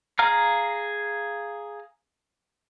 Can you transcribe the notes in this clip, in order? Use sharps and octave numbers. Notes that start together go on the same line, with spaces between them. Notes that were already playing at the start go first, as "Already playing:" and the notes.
G#4 F5 A#5 F6